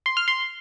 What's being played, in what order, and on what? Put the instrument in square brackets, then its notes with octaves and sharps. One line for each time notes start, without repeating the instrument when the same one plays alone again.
[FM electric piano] C6
F6
C6